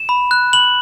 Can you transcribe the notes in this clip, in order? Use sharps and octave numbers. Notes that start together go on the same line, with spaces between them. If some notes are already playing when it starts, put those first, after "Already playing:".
Already playing: E7
B5
F#6
B5 F#7